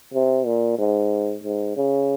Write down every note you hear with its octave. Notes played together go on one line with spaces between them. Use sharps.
C3
A#2
G#2
G#2
C#3